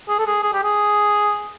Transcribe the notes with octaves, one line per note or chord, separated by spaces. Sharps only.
G#4
A4
G#4
G#4
G4
G#4